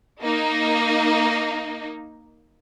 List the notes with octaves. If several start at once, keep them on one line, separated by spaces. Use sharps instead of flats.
A#3 D#4